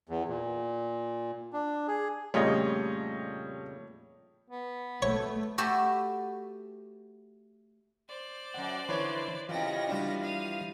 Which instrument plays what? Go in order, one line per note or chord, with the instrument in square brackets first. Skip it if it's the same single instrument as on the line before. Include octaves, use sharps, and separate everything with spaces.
[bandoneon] E2
A#2
D4
G#4
[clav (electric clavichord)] F2 A#2 C#3 [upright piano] G3 D#5 [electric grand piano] A3 C#5
[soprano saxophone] B3
[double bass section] A3 [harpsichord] C#5
[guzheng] A3 F#4 G4 A4 B4
[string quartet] C5 D5
[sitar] F#2 A#2 [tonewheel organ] F#5 D6
[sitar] D3 F3 [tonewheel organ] E3 C6 [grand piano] B4 C#5
[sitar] F2 C#3 G3 [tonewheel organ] E3 F4 [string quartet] B3 A#6
[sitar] F3 F#4 [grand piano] G3 D4
[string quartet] F5 D#6